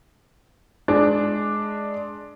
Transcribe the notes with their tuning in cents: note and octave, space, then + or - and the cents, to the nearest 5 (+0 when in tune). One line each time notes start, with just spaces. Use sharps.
G#3 +15 D4 +0